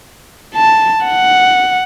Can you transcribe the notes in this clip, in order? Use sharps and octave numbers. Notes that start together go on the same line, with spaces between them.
A5
F#5